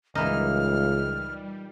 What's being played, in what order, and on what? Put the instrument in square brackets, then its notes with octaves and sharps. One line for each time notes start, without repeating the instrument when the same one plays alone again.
[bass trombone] C#2 [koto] A#2 E3 D#4 [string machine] G3 [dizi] F6